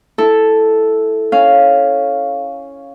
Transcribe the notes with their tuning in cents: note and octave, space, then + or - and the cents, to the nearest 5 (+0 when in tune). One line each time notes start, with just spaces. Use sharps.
E4 +0 A4 +0
C#4 +0 F5 +0